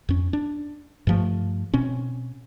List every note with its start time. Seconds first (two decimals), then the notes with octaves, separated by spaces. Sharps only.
0.09 F2 C#4
0.33 D4
1.07 G2 F3 A3
1.74 B2 C4 C#4